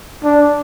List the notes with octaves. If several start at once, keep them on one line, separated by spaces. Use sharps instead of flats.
D4